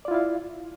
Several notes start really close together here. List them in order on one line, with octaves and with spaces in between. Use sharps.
D5 F4 E4 F5